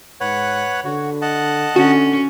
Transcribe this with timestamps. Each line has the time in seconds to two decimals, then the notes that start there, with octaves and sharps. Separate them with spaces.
0.21 G#2 B4 C#5 F#5
0.85 D3 F#4
1.22 D#5 F#5 A5
1.76 D3 C#4 F#4